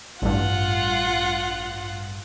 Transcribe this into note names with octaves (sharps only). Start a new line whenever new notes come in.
A1 G2 F4 F#5